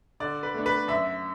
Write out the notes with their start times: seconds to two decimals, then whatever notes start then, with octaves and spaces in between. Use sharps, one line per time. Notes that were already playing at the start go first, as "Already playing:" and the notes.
0.20 D3 D5
0.43 B4
0.54 A3 D4
0.66 B4
0.88 F#2 E5